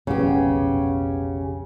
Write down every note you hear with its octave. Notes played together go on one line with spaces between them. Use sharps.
F1 B1 F2 C#3 B3 C#4 G4